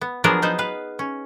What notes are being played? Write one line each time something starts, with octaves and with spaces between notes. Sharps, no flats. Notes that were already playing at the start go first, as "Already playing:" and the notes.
B3
F3 F#3 B3 D4 G#4 A#4
B3 D#4 B4 C5
B4 F5
C#4